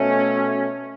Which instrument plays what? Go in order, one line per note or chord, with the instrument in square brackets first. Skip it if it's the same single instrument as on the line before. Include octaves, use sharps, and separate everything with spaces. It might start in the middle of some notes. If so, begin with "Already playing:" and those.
Already playing: [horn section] B2 A3 C#4